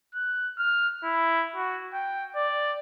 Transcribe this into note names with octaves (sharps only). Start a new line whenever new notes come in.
F#6
F6
E4
F#4
G5
D5